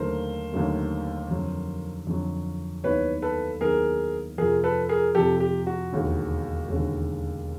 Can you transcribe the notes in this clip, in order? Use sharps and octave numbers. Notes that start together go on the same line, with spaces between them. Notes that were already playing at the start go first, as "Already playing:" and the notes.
Already playing: D#2 D3 F#3 A3 A#4 C5
D#2 D3 F#3 A3
F2 D3 F#3
F2 D3 F#3
D#2 D#3 F#3 B3 E4 B4 C#5
A4 B4
D#2 D#3 F#3 B3 E4 G#4 A#4
F2 C3 F3 G#4 A#4
A4 B4
G#4 A#4
F2 C3 F3 G4 A4
G4
F#4
E1 D#2 D3
E1 D#2 D3